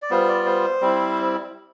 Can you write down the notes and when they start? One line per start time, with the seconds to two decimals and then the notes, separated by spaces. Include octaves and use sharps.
0.02 D5
0.10 G3 B3 F4 C5
0.28 D5
0.46 C5
0.81 G3 C4 E4